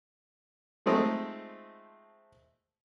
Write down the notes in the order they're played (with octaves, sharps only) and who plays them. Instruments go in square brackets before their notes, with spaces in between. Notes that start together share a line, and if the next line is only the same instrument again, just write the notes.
[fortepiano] F3 G#3 A3 C4 D#4